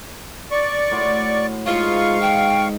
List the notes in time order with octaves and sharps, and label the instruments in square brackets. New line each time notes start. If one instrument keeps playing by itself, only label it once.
[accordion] D5 C#6
[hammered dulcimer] A2 F#4 C6
[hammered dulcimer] G#2 D#5 [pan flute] F4 [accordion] F5 C#6
[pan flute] G5